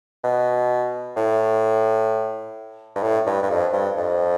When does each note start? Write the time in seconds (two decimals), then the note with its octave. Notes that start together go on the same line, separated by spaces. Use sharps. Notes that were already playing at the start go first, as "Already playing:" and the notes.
0.23 B2
1.16 A2
2.96 G2
3.03 A2
3.27 G2
3.43 G2
3.50 F2
3.73 G2
3.97 F2